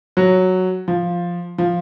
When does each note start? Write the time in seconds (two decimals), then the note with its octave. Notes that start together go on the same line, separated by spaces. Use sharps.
0.17 F#3
0.88 F3
1.58 F3